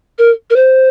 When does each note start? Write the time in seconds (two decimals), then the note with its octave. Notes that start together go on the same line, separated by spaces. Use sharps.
0.19 A#4
0.50 A#4
0.56 C5